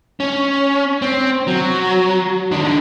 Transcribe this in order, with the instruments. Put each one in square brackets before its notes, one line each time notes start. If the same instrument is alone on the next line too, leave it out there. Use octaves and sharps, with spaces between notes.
[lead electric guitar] C#4
C4
F#3
D#3 D4